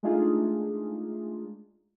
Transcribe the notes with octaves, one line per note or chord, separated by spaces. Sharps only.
G#3 A3 D4 D#4 F4 G#4